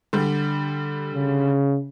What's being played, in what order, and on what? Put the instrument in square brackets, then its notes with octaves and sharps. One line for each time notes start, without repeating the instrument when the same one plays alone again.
[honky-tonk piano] D3 G3
[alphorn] C#3